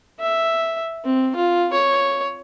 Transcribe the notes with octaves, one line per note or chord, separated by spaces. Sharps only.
E5
C4
F4
C#5